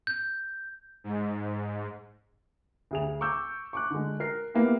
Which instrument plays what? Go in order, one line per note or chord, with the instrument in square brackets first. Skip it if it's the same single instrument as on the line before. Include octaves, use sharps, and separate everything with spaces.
[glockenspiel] G6
[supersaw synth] G#2
[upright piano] D2 G#4 F7
C#6 D6 E6 G6
C#6 D6 F#6
D3 G#3
A#4 C7
A#3 B3 E4 G4